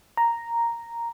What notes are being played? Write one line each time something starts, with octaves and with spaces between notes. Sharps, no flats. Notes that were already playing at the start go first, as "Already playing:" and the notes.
A#5